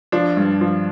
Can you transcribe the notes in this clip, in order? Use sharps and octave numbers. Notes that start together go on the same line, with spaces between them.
F3 D4
G2
F3